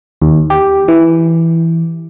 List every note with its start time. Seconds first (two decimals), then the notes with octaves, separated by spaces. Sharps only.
0.22 D#2
0.50 G4
0.88 E3